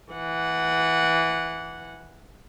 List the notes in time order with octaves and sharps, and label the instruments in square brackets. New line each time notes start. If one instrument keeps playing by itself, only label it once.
[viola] E3 F#5